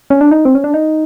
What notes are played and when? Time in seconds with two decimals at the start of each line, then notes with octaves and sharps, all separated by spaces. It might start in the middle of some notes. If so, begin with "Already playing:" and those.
0.10 C#4
0.21 D4
0.31 D#4
0.45 C4
0.55 C#4
0.64 D4
0.74 D#4